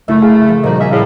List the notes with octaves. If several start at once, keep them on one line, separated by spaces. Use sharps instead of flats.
F#1 A3 E4 E5
E4 G#4 F5
F3
A#2 F3 G3 D#4 F#4 A#4 D#5
A#3 C#4 D#5 E5
A2 G#4 A4 F5